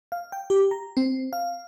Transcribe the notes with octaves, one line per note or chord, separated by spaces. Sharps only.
F5
G5
G4
A#5
C4
F5